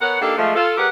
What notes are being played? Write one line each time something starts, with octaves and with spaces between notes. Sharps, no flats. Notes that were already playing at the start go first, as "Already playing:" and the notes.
B3 A#4 C#5 F#5
A#3 D4 D#4 G4 A4
F3 G#3 A3
F4 A4
G3 G4 G#4 A#4 B4 F#5